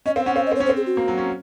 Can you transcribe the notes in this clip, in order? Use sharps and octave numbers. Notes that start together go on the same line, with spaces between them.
C#4 D#5
C4 F5
C#4 F#5
C4 F5
D#5
C4
C#5
C#4
C5
C4
G#4
F#4
A#3
F#3
C#4